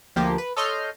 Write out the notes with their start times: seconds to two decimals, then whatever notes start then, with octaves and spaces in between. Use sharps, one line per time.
0.16 D2 F3 A#3 G4
0.38 B4
0.57 A4 C#5 D#5 C6 F6 G6